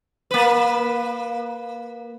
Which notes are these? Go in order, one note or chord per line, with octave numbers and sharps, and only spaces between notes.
A#3 B4